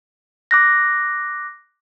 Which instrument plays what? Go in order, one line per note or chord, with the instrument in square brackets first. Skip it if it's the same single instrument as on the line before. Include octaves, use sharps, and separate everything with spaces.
[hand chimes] D6 F#6 A#6